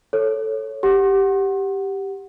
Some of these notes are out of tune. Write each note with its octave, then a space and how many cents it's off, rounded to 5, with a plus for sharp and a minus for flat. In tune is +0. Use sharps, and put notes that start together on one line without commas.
A4 +0 C#5 -5
G4 +0 F#5 +0